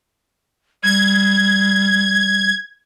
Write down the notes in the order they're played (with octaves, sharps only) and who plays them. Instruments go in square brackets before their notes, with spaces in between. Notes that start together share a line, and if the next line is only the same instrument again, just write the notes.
[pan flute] G3 [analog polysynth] G#6